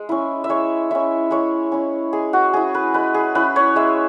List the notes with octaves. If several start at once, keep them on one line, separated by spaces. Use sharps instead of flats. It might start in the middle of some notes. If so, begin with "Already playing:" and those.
Already playing: G#3
C#4 E4
E5
G#3 C#5
C#4 E4 E5
G#3 C#5
C#4 E4
G#3 G#4
F#4
C#4 E4 G#4
B4
G#3 B4
G#4
C#4 E4 B4
C#5
G#3 E5